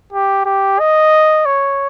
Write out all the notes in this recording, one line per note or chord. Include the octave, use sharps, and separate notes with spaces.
G4
G4
D#5
C#5